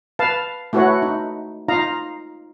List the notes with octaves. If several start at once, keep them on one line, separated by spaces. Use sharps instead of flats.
B4 F5 A5
A3 E4 F#4 B4 C#5 F#5
D#4
D#4 F4 D#5 F5 A#5